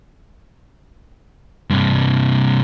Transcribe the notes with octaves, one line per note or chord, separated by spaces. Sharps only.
G2 C3